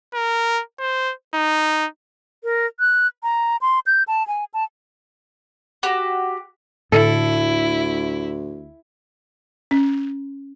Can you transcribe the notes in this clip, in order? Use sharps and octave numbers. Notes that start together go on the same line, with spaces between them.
A#4
C5
D#4
A#4
F#6
A#5
C6
G6
A5
G#5
A5
F#4 G4
D2 A2 D3 E4 A4
C#4